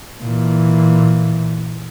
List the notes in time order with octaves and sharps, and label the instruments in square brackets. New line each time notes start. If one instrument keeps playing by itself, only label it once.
[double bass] A#2 E3